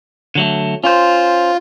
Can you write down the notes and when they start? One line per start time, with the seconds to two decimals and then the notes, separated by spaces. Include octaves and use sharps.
0.35 D3 F#3 A3
0.84 C#4 F4 C5